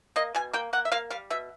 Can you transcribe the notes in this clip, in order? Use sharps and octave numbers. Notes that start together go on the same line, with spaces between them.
A#3 D#5
B2 G#5
A#3 G5
A#3 F#5
E5
A#3 F5
G3 F5
B2 E5